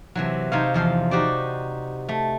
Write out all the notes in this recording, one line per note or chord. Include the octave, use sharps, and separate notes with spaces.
C3 E3 F#3
C3 D#4 C5 C#5 F5
E2 F3 F5 C6
D#4 F#4 G4 C5 D5
A3